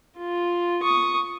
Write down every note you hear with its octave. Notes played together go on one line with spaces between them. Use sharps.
F4
C#6 D#6